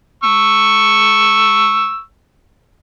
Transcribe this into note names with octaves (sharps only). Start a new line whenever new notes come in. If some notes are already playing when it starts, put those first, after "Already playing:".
C#6 E6